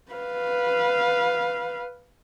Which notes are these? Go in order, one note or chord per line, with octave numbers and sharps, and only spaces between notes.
B4 F5